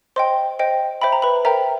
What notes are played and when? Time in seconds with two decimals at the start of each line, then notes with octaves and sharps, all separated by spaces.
0.16 C5 D#5 G5 C6
0.59 C5 D#5 G5
1.01 C5 E5 G5 B5
1.12 A#5
1.22 B4 B5
1.45 A#4 C5 E5 G5 A#5